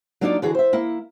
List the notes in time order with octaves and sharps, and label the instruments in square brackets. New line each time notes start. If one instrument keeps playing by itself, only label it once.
[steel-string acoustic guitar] F#3 A#3 D4 D#4 F4 D5
D3 E3 F#4 G#4
C5 E5
A#3 E4